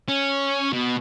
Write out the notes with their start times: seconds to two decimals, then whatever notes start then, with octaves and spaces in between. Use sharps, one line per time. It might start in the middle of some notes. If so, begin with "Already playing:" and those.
0.08 C#4
0.73 B2